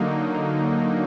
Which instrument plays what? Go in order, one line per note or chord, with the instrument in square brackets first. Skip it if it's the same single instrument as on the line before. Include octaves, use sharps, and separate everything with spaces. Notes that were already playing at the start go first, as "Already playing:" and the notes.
Already playing: [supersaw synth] D3 F#3 A#3 D#4